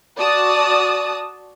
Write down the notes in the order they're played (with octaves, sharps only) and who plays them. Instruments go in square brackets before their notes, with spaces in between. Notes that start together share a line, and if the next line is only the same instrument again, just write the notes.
[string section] F#4 D5 A5 D#6